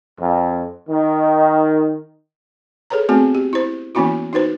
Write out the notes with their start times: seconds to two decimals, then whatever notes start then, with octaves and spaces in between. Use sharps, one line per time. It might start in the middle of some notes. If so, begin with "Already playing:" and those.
0.19 F2
0.89 D#3
2.90 G#4 A4 B4 C#5 A#5
3.09 A3 B3 C4 F#4 G#4
3.35 G4
3.53 E4 C5
3.95 E3 A#3 B3 C#4 E4 F#4
4.33 D#4 F#4 B4 C5